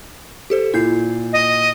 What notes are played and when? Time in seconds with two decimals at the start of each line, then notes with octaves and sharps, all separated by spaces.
0.50 G4 A4 C5
0.74 A#2 E4 G6 C7
1.32 D#5